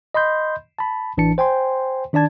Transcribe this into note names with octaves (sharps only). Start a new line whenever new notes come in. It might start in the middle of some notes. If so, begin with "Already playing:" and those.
D#5 B5 C6 G6
A5 B5
A1 E3 D4 A5 C#7
C5 G5 G#5 C6
D#3 D4 D5 A5 G#6